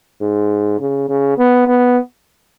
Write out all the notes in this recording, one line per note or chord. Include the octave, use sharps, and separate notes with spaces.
G#2
C#3
C#3
B3
B3